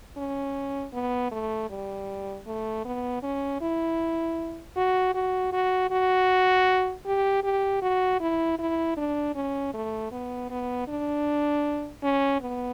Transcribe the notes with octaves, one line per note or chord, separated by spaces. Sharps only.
C#4
B3
A3
G3
A3
B3
C#4
E4
F#4
F#4
F#4
F#4
G4
G4
F#4
E4
E4
D4
C#4
A3
B3
B3
D4
C#4
B3